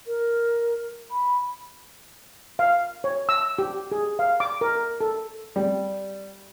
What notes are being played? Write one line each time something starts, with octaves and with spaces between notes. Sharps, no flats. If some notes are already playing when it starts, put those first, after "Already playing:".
A#4
B5
F5
C#5
E6
G4
G#4
F5
D6
A#4
A4
G3